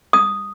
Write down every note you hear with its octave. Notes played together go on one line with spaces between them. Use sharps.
D#6